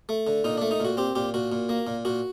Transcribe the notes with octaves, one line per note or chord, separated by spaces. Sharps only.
A3
D3
A#2 D#4
A3 D4
D#4
A#2 F#4
C4 G4
A#2 G4
A#2 F#4
A#2
A#3
A#2
A#2 F#4